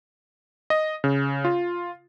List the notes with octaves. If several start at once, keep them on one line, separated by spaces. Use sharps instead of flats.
D#5
C#3
F4